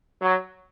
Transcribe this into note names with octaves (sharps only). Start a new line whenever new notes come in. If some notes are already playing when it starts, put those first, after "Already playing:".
F#3